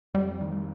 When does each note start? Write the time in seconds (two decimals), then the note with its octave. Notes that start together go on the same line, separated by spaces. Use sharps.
0.14 F2 G3
0.41 D#3